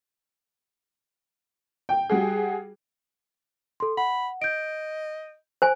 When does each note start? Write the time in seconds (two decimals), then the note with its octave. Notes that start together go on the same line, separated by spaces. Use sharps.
1.89 G5
2.09 G3 F#4 G#4
3.80 A4 C6
3.97 F#5 B5
4.42 D#5 G6 D7
5.62 C5 G#5